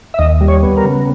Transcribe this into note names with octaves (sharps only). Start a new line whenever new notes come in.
E5
D#2 D#5
G3
C#5
B3
A#4
C#3